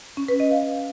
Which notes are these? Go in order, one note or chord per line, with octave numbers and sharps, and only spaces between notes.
C#4
B4
D#5
F5